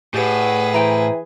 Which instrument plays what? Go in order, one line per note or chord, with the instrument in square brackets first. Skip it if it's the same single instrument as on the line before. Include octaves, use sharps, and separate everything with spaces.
[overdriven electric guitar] A2 [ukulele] G4 D5 F#5 [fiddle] G#4 B4
[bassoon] E3 [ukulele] C5 G5 A#5